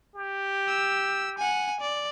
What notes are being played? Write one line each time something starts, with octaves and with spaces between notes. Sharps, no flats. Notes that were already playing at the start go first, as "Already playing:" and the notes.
G4
E6
F#5 G#5
D5